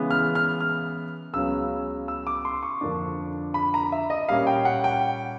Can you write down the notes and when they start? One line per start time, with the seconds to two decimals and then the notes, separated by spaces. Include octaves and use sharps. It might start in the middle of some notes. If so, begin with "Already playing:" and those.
Already playing: C#3 E3 G#3 B3
0.11 F6
0.35 F6
0.60 F6
1.33 C#2 C#3 F#3 B3 E6
2.08 E6
2.27 D6
2.45 C6
2.63 C#6
2.81 F2 D3 F3 A#3 D4
3.54 B5
3.74 A#5
3.92 E5
4.10 D#5
4.29 A#2 G3 A#3 C#4 F5
4.47 G5
4.65 F#5
4.84 G5